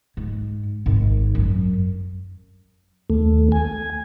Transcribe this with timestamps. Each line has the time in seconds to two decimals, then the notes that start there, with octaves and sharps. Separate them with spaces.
0.17 G#2
0.86 G#1
1.35 F#2
3.10 D#2 A3
3.52 G#5